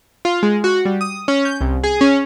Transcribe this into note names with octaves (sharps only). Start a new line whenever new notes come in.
F4
G#3
F#4
G3
D#6
C#4
G6
C2
G#4
C#4